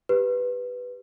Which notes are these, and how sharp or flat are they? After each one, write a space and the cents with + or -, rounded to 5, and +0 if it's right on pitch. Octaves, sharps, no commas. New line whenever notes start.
G4 +0 B4 +0